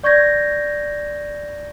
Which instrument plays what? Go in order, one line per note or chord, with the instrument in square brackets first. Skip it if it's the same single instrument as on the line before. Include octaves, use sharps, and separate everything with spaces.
[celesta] D5 C#6 G6 G#6 A#6